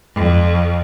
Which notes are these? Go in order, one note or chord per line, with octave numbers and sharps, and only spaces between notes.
F2